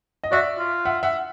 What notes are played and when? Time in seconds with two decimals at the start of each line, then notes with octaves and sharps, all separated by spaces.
0.24 D#5
0.32 F#4 D5 E5
0.58 F4
0.85 E5 F#5
1.03 E5 F#5